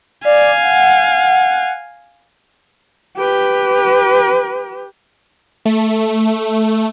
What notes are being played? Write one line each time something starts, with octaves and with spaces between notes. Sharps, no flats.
D5 F5 G#5
F#5
G4 B4
A3